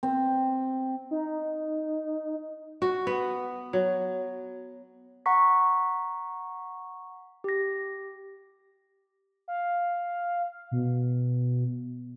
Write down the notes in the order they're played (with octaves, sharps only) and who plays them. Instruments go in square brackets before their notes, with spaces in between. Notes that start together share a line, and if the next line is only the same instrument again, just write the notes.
[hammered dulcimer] C4
[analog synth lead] D#4
[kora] F#4
B3
F#3
[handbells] F#5 A#5 C#6 B6
G4 A#6
[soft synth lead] F5
B2